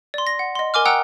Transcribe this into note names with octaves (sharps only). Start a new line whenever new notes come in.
D5 C6
A#6
F#5
D#5 C6
A#4 G#5 D6 F6
F#5 G5 A#5 D#6 E6 F#6